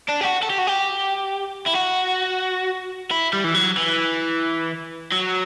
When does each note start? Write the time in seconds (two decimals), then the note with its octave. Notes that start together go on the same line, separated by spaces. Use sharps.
0.09 D4
0.21 G4
0.25 F#4
0.43 A4
0.50 G4
0.59 F#4
0.67 G4
1.67 E4
1.76 F#4
3.11 E4
3.33 G3
3.44 E3
3.54 F#3
3.77 E3
5.12 F#3